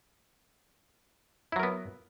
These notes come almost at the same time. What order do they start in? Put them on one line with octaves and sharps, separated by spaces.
E4 F#3 A#4 B3